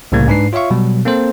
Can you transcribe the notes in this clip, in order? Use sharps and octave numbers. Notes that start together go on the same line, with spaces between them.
C2 A2 C#3 G3 A#3 G#6
G#2 D4 B4 C7
F4 C#5 E5 F5 C#6
B2 F#3 G3
A#3 C4 A4 C5